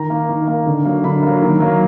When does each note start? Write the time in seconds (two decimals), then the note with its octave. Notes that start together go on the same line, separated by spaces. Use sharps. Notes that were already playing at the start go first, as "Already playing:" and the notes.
Already playing: D#3 A#5
0.10 A#3
0.29 D#3
0.48 A#3
0.66 D3
0.85 F#3 A#3
1.04 D3 B5
1.23 F#3 A#3
1.42 D#3
1.60 F#3 A#3